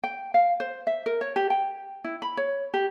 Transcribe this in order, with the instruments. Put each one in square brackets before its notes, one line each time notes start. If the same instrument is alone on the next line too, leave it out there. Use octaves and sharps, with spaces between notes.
[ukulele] G5
F5
C5
E5
A#4
C#5
G4
G5
E4
B5
C#5
G4